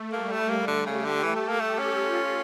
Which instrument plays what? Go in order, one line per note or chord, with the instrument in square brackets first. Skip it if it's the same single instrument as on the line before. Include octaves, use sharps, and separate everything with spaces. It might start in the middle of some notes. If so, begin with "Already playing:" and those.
Already playing: [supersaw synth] A3
[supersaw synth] G3 [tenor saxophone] A#3
[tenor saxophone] A3
[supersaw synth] A3 [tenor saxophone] A#3
[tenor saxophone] D3
[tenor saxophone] C#3 [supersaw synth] G4
[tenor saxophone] D3
[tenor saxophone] E3 [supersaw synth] A4
[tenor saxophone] A3
A#3
[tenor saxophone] A3 [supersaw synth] G4
[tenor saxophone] C#4
[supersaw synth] F4